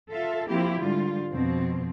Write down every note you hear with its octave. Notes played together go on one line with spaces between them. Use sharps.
F4 A4 E5 F5
F3 A#3 C4 E4 F4 G4
G#2 D3 G3 F4
F2 B2 C4